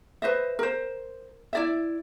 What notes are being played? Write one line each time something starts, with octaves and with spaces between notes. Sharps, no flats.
B4 C5 D#5 E5
A#4 C5
E4 D5 E5